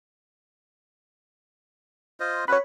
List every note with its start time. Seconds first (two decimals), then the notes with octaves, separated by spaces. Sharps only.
2.20 F4 C5 D#5
2.48 C#4 F#4 B4 C#5 B5